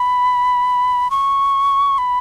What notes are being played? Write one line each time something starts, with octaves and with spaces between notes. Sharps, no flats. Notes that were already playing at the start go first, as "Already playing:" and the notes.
Already playing: B5
C#6
B5